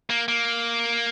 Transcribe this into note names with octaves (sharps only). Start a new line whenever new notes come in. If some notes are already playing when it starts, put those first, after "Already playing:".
A#3
A#3